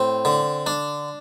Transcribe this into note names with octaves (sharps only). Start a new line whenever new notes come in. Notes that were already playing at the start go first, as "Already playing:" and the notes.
Already playing: A2 C4
D3
D4